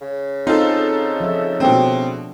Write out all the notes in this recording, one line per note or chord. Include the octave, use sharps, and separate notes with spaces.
C#3
C4 D#4 F4 A4
F3 E5
B2 A3 C4 D4